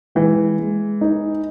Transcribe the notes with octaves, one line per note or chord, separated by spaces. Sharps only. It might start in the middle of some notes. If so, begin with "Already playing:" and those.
E3 G#3
G#3
D#4